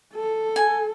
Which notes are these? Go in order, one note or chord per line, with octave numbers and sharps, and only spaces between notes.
A4
G#5